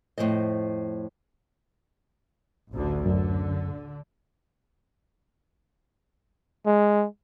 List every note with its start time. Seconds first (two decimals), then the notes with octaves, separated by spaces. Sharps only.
0.18 F2 A2 E3 C5 D#5
2.72 A1 D2 D3
3.06 F#2 D3
6.66 G#3